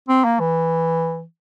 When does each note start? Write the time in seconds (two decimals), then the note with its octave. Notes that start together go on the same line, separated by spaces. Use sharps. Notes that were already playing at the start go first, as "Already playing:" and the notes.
0.09 C4
0.25 A#3
0.40 E3